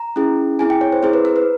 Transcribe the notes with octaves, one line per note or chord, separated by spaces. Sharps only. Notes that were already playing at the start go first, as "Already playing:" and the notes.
Already playing: A#5
C#4 E4 G#4
C4 E4 G#4 G#5
G5
C#5
C5
C4 E4 G#4 C5
B4
A#4
B4